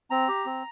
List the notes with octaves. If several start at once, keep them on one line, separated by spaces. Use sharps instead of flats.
C4 A#5
G4
C4